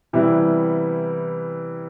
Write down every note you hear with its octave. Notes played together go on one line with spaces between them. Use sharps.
C3 E3 G3 B3 E4